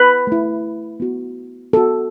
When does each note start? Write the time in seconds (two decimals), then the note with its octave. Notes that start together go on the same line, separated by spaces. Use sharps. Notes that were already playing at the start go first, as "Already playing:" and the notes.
Already playing: B4
0.27 A3 E4
1.00 B3 F#4
1.73 B3 A4
1.77 F#4